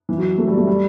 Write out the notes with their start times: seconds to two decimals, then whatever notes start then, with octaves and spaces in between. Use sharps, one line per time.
0.09 E3
0.18 F#3
0.38 A3
0.48 G3
0.57 A3
0.67 G3